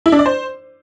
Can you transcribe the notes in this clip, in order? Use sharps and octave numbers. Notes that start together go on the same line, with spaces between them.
E4
D4
D5
C5